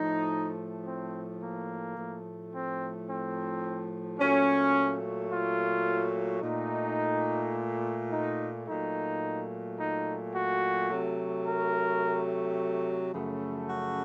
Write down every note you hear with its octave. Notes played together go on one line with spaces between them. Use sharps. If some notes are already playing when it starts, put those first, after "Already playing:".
Already playing: A2 F3 A3 D#4
C4
A#3
A2 F3 A3
C4
C4
A#2 F#3 A3 C#4
F4
A#2 A3 D#4
D#4
A#2 F#3 A3 D#4
D#4
F#4
C3 F#3 A3
A#4
F#2 C#3 F3 A3
F#4